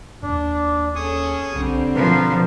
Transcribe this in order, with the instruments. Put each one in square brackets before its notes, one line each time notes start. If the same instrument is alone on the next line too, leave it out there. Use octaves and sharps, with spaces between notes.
[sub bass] D#2 [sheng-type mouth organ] D4
[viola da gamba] C#4 G#4 A4 [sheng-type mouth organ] G#5 C#6 D#6
[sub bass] B1 [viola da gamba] D3 G3 C4
[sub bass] B2 [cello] F3 [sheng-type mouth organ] A#4 B4